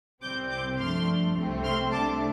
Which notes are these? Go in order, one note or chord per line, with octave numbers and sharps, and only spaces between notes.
C2 C3 G3 C4 D6 G6
D6 G6
G2 F3 A3 D4 C6 F6
C2 C3 A3 C4
C6 F6
C2 C3 A3 D4 A5 D6